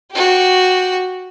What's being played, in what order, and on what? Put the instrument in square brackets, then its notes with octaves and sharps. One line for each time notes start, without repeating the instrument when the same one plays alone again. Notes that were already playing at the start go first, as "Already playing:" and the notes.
[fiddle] F#4 G4